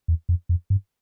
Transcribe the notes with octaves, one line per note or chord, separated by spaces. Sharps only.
E2
F2
F2
G2